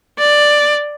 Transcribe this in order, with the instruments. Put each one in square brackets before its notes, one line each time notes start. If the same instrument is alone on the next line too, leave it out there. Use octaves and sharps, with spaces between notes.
[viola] D5